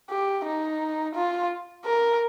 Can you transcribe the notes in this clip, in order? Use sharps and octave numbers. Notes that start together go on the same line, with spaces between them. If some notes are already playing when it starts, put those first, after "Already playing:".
G4
D#4
F4
A#4